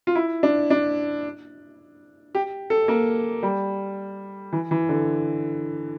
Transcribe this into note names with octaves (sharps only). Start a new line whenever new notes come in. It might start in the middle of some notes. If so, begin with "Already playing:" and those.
F4
E4
D4
D4
G4
A4
A#3
G3
E3
E3
D3